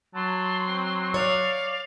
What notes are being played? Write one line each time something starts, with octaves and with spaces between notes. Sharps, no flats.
F#3 A5 C6
C4
C#5 D5 F5